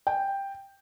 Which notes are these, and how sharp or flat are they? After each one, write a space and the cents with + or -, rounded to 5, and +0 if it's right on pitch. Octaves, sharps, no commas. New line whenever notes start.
G5 +5